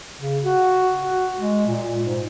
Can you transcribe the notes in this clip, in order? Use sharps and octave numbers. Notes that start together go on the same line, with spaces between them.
C#3
F#4
F#4
G#3
A#2
G#2